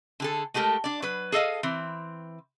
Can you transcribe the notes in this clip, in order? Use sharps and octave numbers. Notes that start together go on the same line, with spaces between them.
D3 G#4 A4
G#3 A3 G4 A4 A#4
D4 D5
F#3 B4
G#4 A4 D#5 F5
E3 C4